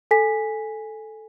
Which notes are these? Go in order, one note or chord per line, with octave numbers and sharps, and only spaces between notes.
A4 G#5 B6